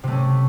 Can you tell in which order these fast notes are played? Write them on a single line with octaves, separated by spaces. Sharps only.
C3 A3 C#4